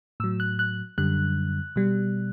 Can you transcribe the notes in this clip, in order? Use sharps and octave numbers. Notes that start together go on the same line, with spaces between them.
A2 F#3 E6
F#6
F#6
F#2 D3 G3 F#6
B2 G3